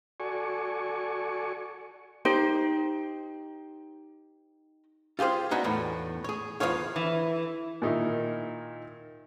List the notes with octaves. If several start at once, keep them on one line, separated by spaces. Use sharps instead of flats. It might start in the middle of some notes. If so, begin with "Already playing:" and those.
F#4 A4 D5 G#5 C#6
D#4 G4 C5
F4 G4 G#4 C5 F5
B3 D#4 F#4 D5 E5 G#5
E2 A2
G#4 C#5
E2 E3 F3 G#4 C#5 F5
E3
A#2 D#3 D#4 E4